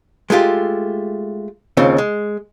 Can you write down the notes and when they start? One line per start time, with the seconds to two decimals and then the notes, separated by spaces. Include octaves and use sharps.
0.30 G#3 A3 F4 G4
1.77 D#2 C#3 C4 F4
1.98 G#3